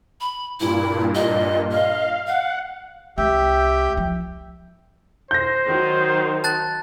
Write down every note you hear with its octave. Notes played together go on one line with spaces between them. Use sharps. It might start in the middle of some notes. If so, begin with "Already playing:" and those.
B5
G2 A#2 E4
D#5
D#5 F5
F5 F#5
C2 G#3 G4 E5 G5
F3
C5 G6 A#6
D#3 F#3 D#4
A5 F#6 A6